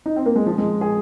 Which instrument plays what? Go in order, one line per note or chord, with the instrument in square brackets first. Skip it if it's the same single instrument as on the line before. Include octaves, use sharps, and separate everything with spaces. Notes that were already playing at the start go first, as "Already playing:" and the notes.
[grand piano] D#4
C4
A#3
G#3
F3
G#3
G#4